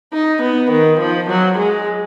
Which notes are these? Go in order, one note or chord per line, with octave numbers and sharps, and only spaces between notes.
D#4
B3
D#3
F3
F#3
G#3